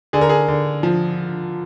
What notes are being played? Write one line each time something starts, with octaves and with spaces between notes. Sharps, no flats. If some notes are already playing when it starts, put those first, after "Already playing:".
D3 G#4
A#4
G#4
D3
F3